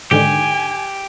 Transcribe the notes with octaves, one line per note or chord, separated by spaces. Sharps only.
G#2 D3 D#3 G4 G#5